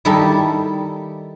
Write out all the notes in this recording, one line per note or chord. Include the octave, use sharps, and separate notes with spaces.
D#3 G3 D#4 E4 A4